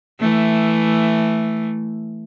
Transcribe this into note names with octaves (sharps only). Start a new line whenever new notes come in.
E3 A3